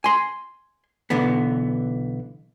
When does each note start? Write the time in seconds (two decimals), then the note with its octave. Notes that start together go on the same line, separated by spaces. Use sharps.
0.04 G#5 C6
1.10 B1 D3 E3 B3